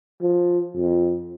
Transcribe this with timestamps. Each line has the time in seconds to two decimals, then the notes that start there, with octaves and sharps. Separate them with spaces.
0.22 F3
0.76 F2